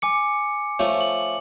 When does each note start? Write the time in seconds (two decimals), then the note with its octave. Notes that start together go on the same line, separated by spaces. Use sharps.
0.02 G#5 D6 C#7
0.79 F3 A3 C#4
1.01 F#7